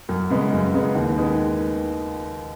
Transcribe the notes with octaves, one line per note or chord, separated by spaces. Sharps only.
F#2
C#3 G#3 B3
F#2
C#3 G#3 B3
D#2
D#3 G#3 B3